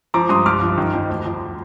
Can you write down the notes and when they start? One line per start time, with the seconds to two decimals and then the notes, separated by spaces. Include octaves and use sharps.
0.14 F3 A#5 D6
0.29 G2 C6 D#6
0.46 C2 D6 F6
0.62 F3
0.78 D#3
0.94 F2
1.09 D2
1.25 F3